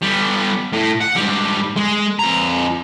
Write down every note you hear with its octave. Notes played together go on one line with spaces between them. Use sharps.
G3 B3
A2
F#5
G#2 G3
G#3
F2 A#5